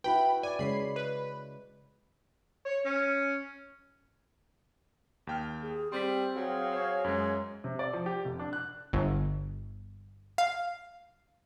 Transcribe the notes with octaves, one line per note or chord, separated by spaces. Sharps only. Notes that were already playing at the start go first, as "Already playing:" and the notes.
E4 F#4 B4 G5 B5
D5 G#5
C#3 G#3 C#5 B5 C7
B4
C#5
C#4
D#2 G5 F6
G#4
G3 C4 C6 B6
F#3 G#4 F5
C5 C#5 C#6
F#2 G#3
C3
D5
F3
G4
F1
D4
F#6
G1
F5